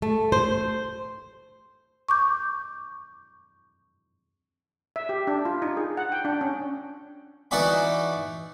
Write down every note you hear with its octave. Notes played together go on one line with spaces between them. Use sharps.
A3
C5
C#6 D6 G6
E5
G4
D4
F4
D#4
G#4
F#5
G5
D4
C#4
E3 D#4 F#4 D5 G#5 B5